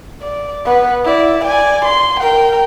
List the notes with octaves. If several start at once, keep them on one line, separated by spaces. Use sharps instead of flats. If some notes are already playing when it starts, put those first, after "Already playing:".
D5
B3 B4
E4 D5
D5 G#5
C6
A#4 G5